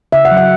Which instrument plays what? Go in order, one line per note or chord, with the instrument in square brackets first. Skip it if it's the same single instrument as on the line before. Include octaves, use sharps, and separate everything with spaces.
[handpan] C#3 E5
F#5
F#3
F#5